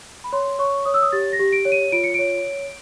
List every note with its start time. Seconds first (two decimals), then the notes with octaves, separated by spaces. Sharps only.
0.24 B5
0.33 C#5 C6
0.59 C#5 C#6
0.85 C#5 D#6
0.94 E6
1.02 D#6
1.12 G4 A6
1.33 A#6
1.39 G4
1.53 D7
1.65 C#5
1.72 D#7
1.92 F4 D7
2.04 C#7
2.14 C#5 D7